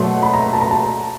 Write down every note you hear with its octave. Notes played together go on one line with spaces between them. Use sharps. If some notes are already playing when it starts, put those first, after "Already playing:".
Already playing: B2 F#3 A3 C6
B5
A#5
A5
A#5
A5